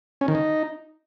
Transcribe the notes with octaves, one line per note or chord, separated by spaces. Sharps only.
C#4
D#3
D#4